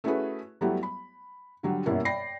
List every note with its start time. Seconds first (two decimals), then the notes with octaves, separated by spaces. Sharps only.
0.04 A3 C#4 E4 F#4 G#4 B4
0.61 F#3 G3 A3 B3 E4 G4
0.83 B5
1.63 D3 F#3 G3
1.86 F#2 B2 G3 A#3 E4
2.05 D5 G5 B5 A#6 C7